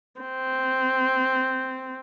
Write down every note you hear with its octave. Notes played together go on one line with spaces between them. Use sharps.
C4